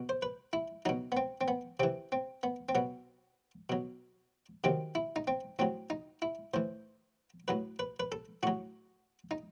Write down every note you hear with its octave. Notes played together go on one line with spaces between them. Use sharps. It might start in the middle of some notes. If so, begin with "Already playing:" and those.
Already playing: B2
C5
B4
E4
B2 F#3 D#4
B3
C4
C4
B3
C3 E3 C4
C4
B3
C4
B2 F#3 B3
B2 F#3
C3 D#3 F#3 C4
E4
D#4
C4
A2 F#3 C4
D#4
E4
A2 E3 C5
A2 F#3 B4
B4
B4
A4
A2 F#3 F#4
D#4